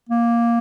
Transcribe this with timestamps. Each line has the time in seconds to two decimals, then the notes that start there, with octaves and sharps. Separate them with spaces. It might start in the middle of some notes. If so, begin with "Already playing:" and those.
0.09 A#3